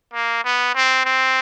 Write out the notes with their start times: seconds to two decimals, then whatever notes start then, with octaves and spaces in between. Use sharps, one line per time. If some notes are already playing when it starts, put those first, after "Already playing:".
0.13 A#3
0.44 B3
0.75 C4
1.05 C4